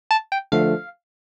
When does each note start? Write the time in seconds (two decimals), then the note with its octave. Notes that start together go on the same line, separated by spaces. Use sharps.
0.11 A5
0.32 G5
0.52 D3 F3 A3 F5